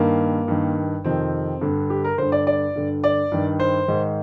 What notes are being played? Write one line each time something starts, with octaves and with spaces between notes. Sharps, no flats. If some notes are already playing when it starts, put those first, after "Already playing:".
Already playing: G2 D#3 A#3
G2 D#3
F2 C3 D#3 C4
G2 D3
G4
A#4
G2 D3 C5
D5
D5
G2 D3
D5
G2 D#3
C5
G#2 D#3